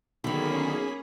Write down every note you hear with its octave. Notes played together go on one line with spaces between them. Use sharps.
B1 D3 D#3 A#3 C#4 G#4 B5